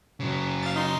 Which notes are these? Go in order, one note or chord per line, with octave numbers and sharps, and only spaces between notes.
C#3 F#3
F5 A6
D#4 C6